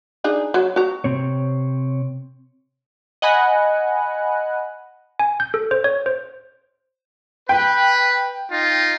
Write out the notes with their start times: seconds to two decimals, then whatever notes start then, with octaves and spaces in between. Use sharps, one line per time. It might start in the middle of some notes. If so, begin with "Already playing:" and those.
0.24 D4 D#4 G#4
0.54 F#3
0.76 F#4 A#5
1.04 C3 C4 C#5
3.22 D#5 F#5 G#5 B5 F#6
5.19 G#5
5.40 G6
5.54 A4
5.71 C5
5.84 C#5
6.06 C5
7.49 B4 G5
8.51 D#4 F4